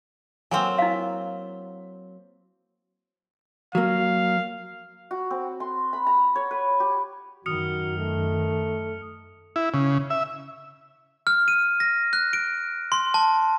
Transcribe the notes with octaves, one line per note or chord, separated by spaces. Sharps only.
F#3 A#3 C4 G#5
E4 F5
F#3 A#3 F5
F#4
C4
C6
B5
A#5
C#5
B4
G4
F#2 D#3 F#4 D#6 F6 C#7
A3
E4
C#3
E5
F6
D#7
A#6
F#6
D7
C6
A5